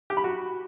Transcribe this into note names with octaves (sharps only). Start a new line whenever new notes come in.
G4
B5
F#4